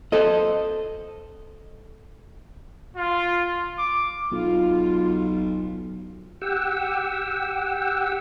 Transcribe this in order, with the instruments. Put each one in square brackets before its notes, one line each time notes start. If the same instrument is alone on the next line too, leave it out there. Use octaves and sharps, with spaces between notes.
[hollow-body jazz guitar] A4 C5 D#5
[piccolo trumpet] F4
D6
[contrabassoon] B1 [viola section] F4
[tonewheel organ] G4 F#5 G5 E6